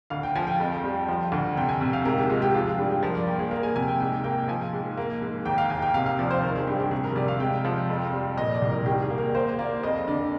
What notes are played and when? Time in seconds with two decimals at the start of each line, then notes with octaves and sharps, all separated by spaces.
0.10 D2 F5
0.23 G5
0.35 F3 G#5
0.47 G5
0.60 F2
0.84 G3
1.09 F3
1.32 D2
1.57 C3 G5
1.69 G#5
1.81 C3
1.93 F5
2.05 G#2 A#4
2.18 G4
2.29 G#3 F4
2.42 G4
2.54 F3 F4
2.66 G#4
2.78 G2 G4
2.90 G4
3.02 F3 A#4
3.15 D5
3.27 A#3 G5
3.39 G#4
3.51 A#3 A#4
3.63 G#5
3.76 C3 G#5
3.88 G5
4.00 G#2 G5
4.24 A#3 G5
4.48 F3 G#5
4.73 G#2
4.97 A#3
5.22 G#2
5.45 D#2 G5
5.58 F5
5.70 D#2 G#5
5.82 G5
5.94 C3 F5
6.06 F5
6.19 F3 D5
6.31 C5
6.43 D#3 A#4
6.56 G#4
6.67 G2 G4
6.80 G4
6.91 C3 G#4
7.04 A#4
7.15 C3 D5
7.28 F5
7.40 G#3 G5
7.65 F3
7.89 F2
8.13 G3
8.37 A#2 D#5
8.54 D5
8.62 C2
8.70 A#4
8.86 D#3 G4
9.02 G#4
9.10 A#3
9.18 A#4
9.35 A#3 C5
9.59 A#3 D5
9.83 F2 D#5
10.08 D3 D5